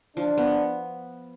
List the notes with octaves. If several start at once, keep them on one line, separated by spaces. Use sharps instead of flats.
F3 D4
B3